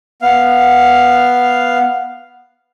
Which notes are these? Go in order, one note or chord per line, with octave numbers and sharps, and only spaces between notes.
B3 F5